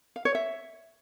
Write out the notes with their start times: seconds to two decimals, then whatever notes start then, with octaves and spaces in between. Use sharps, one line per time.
0.16 F5
0.25 C#5
0.35 E5